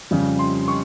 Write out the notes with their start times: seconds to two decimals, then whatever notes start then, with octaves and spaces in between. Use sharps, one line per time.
0.11 F2 C#3 G3
0.39 C6
0.68 C#6